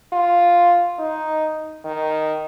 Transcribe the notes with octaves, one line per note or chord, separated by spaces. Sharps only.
F4
D#4
D#3